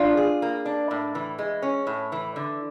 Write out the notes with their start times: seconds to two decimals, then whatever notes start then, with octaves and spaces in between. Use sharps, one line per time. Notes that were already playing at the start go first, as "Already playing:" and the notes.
Already playing: D4 F4
0.17 G#4
0.42 A#3
0.66 D4
0.91 A2
1.15 E3
1.39 G#3
1.62 C#4
1.87 A2
2.12 E3
2.36 D3